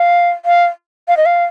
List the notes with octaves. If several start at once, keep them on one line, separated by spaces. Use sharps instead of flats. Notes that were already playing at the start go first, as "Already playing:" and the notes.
Already playing: F5
F5
F5
D#5
F5